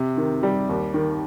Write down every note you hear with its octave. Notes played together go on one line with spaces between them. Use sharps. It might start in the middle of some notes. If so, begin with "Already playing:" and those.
Already playing: C3
D#3
G3
D#2
D#3